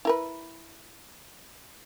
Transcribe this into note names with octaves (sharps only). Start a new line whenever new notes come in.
E4 A#4 B4